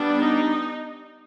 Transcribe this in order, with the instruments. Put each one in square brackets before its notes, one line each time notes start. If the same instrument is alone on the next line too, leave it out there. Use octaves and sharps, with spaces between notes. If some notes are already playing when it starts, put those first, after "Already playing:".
Already playing: [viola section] G3 B3 D4
D#4